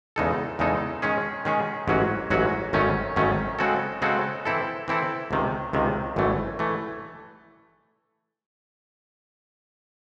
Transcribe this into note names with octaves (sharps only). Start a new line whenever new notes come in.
E2 C#3 G#3 D#4 A4
E2 C#3 G#3 D#4 A4
D#3 G#3 C#4 G#4
D#3 G#3 C#4 G#4
A1 G#2 F#3 C#4 F#4
A1 G#2 F#3 C#4 F#4
G#1 F#2 D#3 A3 C#4
G#1 F#2 D#3 A3 C#4
C#3 G#3 C4 F#4 A4
C#3 G#3 C4 F#4 A4
E3 C4 E4 A4
E3 C4 E4 A4
C#2 C3 D#3
C#2 C3 D#3
G#1 F#2 E3 A3
E3 A3